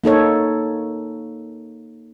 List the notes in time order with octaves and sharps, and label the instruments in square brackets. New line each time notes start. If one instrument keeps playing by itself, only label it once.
[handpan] A#3 D#4 A4 C#5